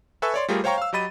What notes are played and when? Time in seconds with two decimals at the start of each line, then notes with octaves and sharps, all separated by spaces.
0.22 A4 B4 E5 G#5 C#6 E6
0.34 C#5 D5 C6
0.48 G3 A3 F4 G4 G#4 A#4
0.64 C5 C#5 F5 G5 A#5 C#6
0.78 F5 E6
0.93 F#3 G4 D#5 B5 A6 D#7